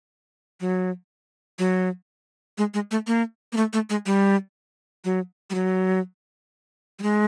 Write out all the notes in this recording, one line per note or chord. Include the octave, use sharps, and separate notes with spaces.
F#3
F#3
G#3
G#3
A3
A#3
A#3
A3
A3
G#3
G3
F#3
G3
F#3
G3
G#3